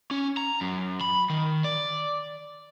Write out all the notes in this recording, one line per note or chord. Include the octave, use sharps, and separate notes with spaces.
C#4
A#5
F#2
B5
D#3
D5